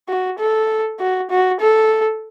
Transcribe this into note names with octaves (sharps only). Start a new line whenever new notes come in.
F#4
A4
F#4
F#4
A4